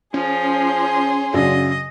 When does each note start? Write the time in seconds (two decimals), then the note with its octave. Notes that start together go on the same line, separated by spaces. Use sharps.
0.14 F3 C#4 G#4 C6
1.34 F#2 C#3 D4 D#5